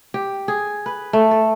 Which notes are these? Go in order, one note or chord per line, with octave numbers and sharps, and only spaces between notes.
G4
G#4
B4
A3
A4